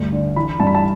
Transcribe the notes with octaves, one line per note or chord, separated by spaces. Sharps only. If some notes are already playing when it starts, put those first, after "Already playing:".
Already playing: D2 G2
D3
E3 B5
G2 A5
B5
A5